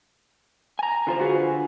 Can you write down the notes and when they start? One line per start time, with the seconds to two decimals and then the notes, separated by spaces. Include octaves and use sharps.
0.79 G#5 A#5
1.07 D3 F4 C5
1.20 F#4 G#4 B4